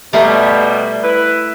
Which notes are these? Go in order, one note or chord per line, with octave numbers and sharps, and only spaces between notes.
B2 G3 A3 A#4 C6
E4 B4